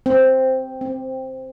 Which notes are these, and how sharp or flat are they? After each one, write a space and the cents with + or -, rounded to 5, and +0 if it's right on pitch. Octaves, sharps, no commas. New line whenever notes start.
C4 +0
C4 +5